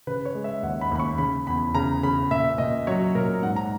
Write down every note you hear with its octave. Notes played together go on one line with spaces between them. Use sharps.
C#3 B4
C#5
G#3
E5
D#2 F#5
B5
D#2 B5
C#6
C#3 B5
E2 B5
C#3 A#5
C#3 B5
A#2 E5
A#2 D#5
F#3 C#5
A#2 A#4
G#2 F#5
A#5